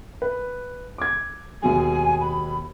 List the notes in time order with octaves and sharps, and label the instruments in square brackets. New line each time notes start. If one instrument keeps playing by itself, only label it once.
[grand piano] B4
D6 G#6
[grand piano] D#2 B2 G#3 [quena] G#5
[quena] B5